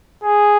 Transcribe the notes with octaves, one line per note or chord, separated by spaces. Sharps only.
G#4